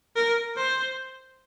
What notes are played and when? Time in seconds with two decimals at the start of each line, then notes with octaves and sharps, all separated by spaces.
0.16 A#4
0.56 C5